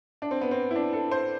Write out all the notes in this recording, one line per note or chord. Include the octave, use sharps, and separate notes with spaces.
D4
C4
B3
C4
E4
D4
A4
C5